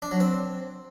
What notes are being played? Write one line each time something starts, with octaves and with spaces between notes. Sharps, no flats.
D4
F#3
C4